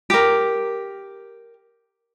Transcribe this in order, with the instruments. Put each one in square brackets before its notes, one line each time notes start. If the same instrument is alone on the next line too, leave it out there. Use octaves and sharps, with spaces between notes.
[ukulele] G4 A#4